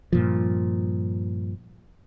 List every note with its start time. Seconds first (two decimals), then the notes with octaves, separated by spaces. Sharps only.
0.13 G2 A#2 F3